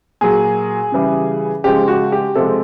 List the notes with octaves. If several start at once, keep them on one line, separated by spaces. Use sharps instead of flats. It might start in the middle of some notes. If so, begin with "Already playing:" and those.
A#2 F#3 G#4
C#3 E3 G3
C#3 F3 G#3 G4
F#4
G4
C3 F3 G#3 A4